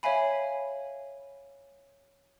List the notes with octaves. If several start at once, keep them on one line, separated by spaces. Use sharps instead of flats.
C#5 E5 F5 G#5 B5